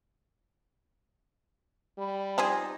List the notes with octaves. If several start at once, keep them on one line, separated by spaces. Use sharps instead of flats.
G3 B5
F3 C4 D#4 G4 G#4 D5